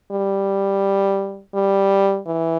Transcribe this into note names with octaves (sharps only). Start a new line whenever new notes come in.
G3
G3
E3